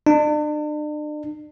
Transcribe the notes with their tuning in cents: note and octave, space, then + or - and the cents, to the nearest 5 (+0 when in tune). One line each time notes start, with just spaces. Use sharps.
D4 +40